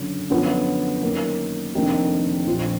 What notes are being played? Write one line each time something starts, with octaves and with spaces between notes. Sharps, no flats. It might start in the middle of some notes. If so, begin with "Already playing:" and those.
Already playing: F#1 F#2 D3
F#2 D3 F3 B3 F4
F#2 D#3 A#3
F1 F2 D#3 A#3 D4
A#1 A#2 F3